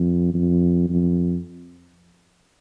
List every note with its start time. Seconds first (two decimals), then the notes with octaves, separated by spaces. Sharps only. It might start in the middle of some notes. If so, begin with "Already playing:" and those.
Already playing: F2
0.34 F2
0.89 F2